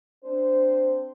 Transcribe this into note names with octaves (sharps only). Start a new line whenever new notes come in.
C4 D4 C5